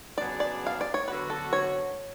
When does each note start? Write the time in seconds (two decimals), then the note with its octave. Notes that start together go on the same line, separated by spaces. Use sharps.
0.17 C#3 F#3 B3 D4 G#4 D5
0.40 D5
0.67 F5
0.81 D5
0.94 C#5
1.08 D3 F#3 B3 F#4 B4
1.30 A4
1.53 C#5